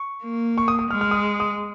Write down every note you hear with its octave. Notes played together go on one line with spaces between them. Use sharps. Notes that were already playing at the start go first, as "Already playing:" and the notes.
Already playing: C#6
A#3
C#6
D#6
D#6
G#3 F6
F6
D#6
D#6